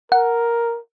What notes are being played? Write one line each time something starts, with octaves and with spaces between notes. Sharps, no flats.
A#4 F#5